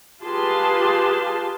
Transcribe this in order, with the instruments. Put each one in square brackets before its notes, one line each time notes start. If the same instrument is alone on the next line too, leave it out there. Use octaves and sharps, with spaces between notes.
[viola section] F4 G4 G#4 B4 A5 C6